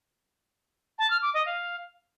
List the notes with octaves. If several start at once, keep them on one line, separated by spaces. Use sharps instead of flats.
A5
F6
D6
D#5
F5